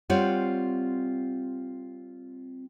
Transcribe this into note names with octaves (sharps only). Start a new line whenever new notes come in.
G3 C4 F4 C#5 F#5